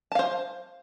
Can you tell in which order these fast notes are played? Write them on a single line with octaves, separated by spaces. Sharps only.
A5 F5 C5